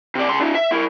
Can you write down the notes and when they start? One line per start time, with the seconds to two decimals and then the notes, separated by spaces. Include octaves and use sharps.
0.15 C3 D5
0.29 C#3 C6
0.41 D4 E4
0.55 E5
0.72 E4 A#4